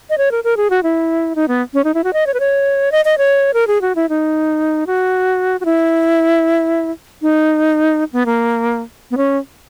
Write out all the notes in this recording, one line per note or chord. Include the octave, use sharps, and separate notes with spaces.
D#5
C#5
A#4
A#4
G#4
F#4
E4
D#4
B3
C#4
D#4
E4
F#4
D#5
C#5
B4
C#5
D#5
D#5
C#5
A#4
G#4
F#4
E4
D#4
F#4
F#4
E4
D#4
B3
A#3
B3
C#4